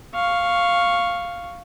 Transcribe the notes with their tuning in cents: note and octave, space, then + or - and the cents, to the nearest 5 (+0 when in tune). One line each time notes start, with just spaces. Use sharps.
F5 +0 C#6 +0